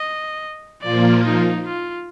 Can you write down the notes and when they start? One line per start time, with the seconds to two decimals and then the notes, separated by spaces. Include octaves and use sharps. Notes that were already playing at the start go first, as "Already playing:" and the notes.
Already playing: D#5
0.82 A#2 F3 A#3 F4 D5
1.24 D#4
1.65 F4